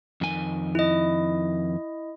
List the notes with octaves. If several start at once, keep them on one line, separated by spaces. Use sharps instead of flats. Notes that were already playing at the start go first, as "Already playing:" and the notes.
F2 D#3 G#5
E4 D#5